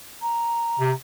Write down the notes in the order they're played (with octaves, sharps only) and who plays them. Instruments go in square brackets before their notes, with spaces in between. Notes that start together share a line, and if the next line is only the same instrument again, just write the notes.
[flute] A#5
[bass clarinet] C3